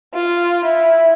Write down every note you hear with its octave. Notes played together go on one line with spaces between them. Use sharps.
F4
E4